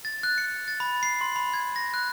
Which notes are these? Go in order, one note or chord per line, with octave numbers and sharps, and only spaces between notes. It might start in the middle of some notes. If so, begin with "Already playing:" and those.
A6
F#6
C#7
A6
B5
C7
C6
B5
G#6
A#6
F#6